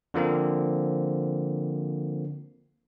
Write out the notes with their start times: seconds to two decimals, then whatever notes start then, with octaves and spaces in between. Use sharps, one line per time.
0.14 D3 F3 A#3 C4